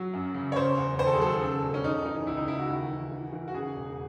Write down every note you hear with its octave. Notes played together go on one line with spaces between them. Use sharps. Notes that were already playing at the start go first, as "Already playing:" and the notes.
Already playing: F#3
F#2
C#3
C#5
C#3 C5
E2
D#2 C5
A4
G#4
F#3 A4
C#3
E1
C#4
C#3 D#4
E3 D#4
C#2 E4
D#4
C#2 E4
F#4
D#2 F#4
E3
E3
E3
F#4
C#3 G#4
E1